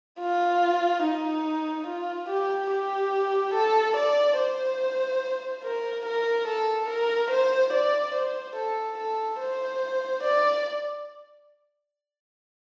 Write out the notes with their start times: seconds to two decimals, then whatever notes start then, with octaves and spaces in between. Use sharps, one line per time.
0.20 F4
1.03 D#4
1.87 F4
2.29 G4
2.71 G4
3.54 A4
3.96 D5
4.38 C5
5.64 A#4
6.06 A#4
6.48 A4
6.89 A#4
7.31 C5
7.73 D5
8.15 C5
8.56 A4
8.98 A4
9.40 C5
10.23 D5